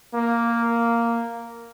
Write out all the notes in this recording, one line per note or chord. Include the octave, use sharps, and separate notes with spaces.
A#3